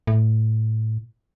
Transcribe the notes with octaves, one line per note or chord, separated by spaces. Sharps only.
A2